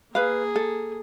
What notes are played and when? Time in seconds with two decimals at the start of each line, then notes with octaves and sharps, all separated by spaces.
0.15 A#3 G#4 B4 F5
0.56 A4